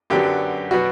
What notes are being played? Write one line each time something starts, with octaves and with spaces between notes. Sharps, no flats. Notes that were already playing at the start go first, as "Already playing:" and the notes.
F#2 D3 F#3 B3 G4
B2 F#3 B3 F#4